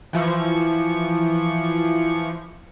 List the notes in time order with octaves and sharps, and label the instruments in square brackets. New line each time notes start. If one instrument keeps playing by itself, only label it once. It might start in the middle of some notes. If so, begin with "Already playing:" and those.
[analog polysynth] E3 F3 C#6